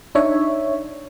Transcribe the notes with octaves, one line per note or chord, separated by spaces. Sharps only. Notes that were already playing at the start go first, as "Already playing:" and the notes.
D4 D#4 C#5 E5